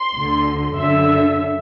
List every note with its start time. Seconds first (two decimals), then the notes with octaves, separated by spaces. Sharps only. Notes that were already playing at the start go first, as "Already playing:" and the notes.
Already playing: C6
0.14 D2 D3
0.75 F#2 D3 E5